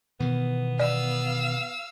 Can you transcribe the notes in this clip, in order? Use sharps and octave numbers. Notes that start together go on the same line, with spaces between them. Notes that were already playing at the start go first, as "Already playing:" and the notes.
B2 D#3 E3 B3
D5 F5 E6